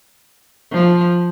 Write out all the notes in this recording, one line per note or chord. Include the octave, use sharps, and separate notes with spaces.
F3